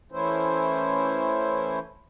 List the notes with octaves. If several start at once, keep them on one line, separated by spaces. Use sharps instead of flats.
E3 A3 C#4 E4 C5